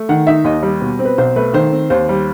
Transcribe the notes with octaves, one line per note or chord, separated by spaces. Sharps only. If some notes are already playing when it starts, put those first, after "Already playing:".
Already playing: A3
D#3 F#5
D#4 E5
D#2 D#5
G3
B2
C4
B4
B1 C5
A3 B4
D#3 C5
C4
D#2 C5
G3